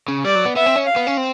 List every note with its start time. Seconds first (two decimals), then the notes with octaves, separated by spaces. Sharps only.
0.08 C#3
0.25 G3 D5
0.35 F#3
0.45 B3
0.56 B3 E5
0.66 C4
0.76 C#4
0.87 F5
0.96 B3
1.07 C#4
1.17 C4